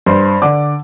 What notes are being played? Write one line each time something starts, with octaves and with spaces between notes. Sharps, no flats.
G2 C5 C6
D3 D5 D6